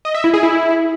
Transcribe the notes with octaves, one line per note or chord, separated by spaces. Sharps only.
D#5
E5
E4
G#4
E4